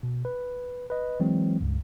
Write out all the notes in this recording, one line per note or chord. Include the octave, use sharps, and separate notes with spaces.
B2
B4
B4 D#5
E3 F#3 G#3 C4
C#2 G2